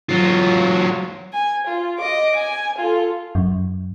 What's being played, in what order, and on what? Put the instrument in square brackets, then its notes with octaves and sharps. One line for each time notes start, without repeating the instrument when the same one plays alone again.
[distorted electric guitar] F#3 F4
[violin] G#5
F4
D#5 D6
G#5
F4 A4
[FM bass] F#2